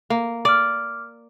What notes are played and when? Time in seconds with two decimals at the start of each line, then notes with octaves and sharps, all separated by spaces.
0.10 A#3
0.45 D5 D6 F6